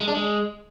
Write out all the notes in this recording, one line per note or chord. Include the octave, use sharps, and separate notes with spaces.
G#3
D4
G#3